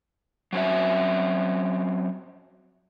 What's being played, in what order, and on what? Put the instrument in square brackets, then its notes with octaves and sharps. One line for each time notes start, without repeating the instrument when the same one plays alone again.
[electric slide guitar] F#3 C4 C#4 F#4 E5